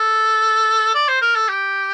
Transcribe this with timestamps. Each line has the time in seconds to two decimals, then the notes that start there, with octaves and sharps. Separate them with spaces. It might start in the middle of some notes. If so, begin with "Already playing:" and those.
Already playing: A4
0.95 D5
1.09 C5
1.22 A#4
1.36 A4
1.49 G4